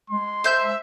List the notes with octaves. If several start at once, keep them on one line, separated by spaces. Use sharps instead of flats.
G#3 C6
C5 E5 G6